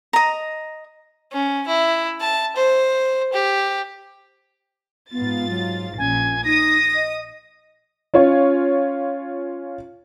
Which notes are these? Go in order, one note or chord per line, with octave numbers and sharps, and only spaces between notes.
D#5 A#5
C#4
E4
A5
C5
G4
G#2 B3 F4 A6
F#3
A#1 A#2 C#4 G#5
D#4 D#6 A#6
D#5
C#4 F4 C#5